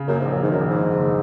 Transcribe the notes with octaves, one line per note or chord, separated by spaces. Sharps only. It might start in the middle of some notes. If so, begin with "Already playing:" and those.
Already playing: C#3
F#2 A#3
G#2
A#1
F#2
G#2 D#3
F#2
A#1
G#2
F#1
F#1